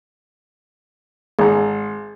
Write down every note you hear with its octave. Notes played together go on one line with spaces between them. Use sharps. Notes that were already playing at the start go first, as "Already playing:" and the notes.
G#1 G#4 A#5